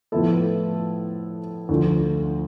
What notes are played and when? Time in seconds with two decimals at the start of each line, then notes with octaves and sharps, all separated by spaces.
0.12 A2 F3 B3 E4 A4
1.69 D2 D3 F3